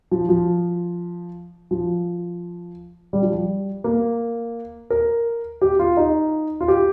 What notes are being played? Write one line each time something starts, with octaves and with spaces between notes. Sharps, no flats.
F3
F3
F3
G3
F3
G3
A#3
A#4
G4
F4
D#4
F4
G4